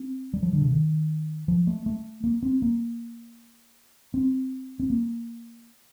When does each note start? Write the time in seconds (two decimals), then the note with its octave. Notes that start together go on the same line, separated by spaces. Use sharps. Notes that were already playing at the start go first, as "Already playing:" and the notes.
Already playing: C4
0.33 G3
0.43 F3
0.53 D3
0.62 C3
0.71 D#3
1.48 F3
1.67 A3
1.86 A3
2.24 A#3
2.43 C4
2.62 A#3
4.14 C4
4.80 C4
4.90 A#3